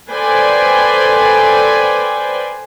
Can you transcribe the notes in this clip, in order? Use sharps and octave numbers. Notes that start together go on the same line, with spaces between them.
A4 B4 C5 D5 G5 G#5